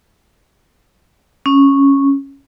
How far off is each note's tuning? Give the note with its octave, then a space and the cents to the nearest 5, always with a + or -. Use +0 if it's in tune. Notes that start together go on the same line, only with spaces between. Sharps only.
C#4 -5